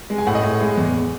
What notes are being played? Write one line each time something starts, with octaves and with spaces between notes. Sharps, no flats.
G#3
G#5
A2 F#5
D#5
A2
G#3
E2